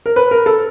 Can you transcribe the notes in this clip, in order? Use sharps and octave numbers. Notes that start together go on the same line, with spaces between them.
A#4
B4
A#4
A4